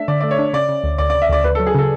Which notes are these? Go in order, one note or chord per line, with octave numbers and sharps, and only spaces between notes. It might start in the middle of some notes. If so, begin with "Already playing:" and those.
Already playing: A3 D4 E5
D3 D5
A3 D5
C#5
D4
C#3 D5
C#3
D2
D2 D5
D5
C#3
E5
D2 D5
D2 B4
A4
F#3
G#4
C#3 A4